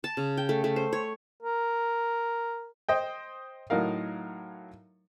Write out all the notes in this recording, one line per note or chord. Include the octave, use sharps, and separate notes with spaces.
A5
C#3
G5
A3
A3
C5
C#5
A#4
C5 D#5 G5
A2 F#3 D#4 A#4 F5